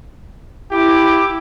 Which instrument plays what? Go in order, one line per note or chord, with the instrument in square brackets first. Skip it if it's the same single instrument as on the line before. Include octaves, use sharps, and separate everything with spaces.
[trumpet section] E4 [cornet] G4 [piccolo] D6